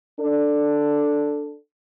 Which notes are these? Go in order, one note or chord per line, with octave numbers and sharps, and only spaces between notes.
D4 A4